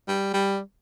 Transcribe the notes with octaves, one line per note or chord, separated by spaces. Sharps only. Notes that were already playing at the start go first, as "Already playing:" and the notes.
G3
G3